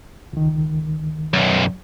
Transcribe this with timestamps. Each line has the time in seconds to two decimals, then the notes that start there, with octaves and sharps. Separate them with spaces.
0.33 C#2 D#3
1.34 B1 F#2